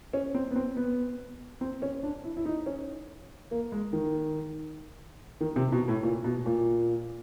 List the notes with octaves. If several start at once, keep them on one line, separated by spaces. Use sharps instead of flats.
C#4
C4
B3
C4
B3
C4
C#4
D4
E4
E4
D#4
C#4
A#3
G#3
D#3
D#3
C3
B2
A2
A#2
B2
A#2